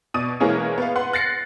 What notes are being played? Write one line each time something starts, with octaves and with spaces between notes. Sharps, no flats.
B2 D5 D#6 D#7
B2 E3 G#3 A#3 C#4 G#4
B3 F5
B4 F#5 C6
F#6 A6 A#6 C7 C#7